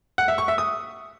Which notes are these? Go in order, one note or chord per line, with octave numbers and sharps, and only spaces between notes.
F#5
E5
C#6
E5
D#6